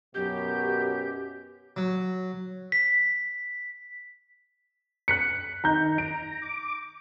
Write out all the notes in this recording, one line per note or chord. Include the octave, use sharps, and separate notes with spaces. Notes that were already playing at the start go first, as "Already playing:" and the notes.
F#2 B2 G4 G6
F#3
B6
F#6 B6 C#7
D#3 D#4 A#5 G6
A#5 D7
D6